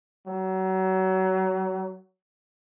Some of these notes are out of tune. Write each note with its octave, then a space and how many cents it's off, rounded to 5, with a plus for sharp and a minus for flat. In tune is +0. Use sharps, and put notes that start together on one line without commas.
F#3 +30